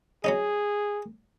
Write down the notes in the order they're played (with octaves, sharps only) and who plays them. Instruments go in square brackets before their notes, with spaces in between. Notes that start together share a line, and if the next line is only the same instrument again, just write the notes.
[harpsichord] F#3 C#4 D#4 [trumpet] G#4